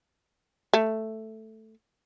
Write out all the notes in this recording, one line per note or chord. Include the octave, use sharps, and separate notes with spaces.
A3